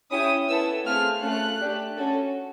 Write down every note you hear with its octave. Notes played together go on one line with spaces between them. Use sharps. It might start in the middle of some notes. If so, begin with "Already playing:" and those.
C#4 E4 G4 D#6
B3 E4 A4 E6
A3 C4 F4 G#4 F6
A3 C#4 F4 A4 F#6
A3 D4 G4
C#4 F#4 A4